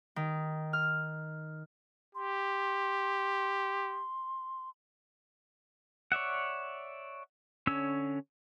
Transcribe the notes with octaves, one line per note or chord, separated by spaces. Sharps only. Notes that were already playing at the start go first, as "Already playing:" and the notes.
D#3
F6
G4 C6
C#5 D5 E5 F#5
D3 C#4 C#5 E6